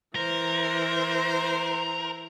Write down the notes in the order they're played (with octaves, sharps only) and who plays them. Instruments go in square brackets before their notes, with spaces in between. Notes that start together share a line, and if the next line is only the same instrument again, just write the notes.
[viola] E3 C5 [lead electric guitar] A#4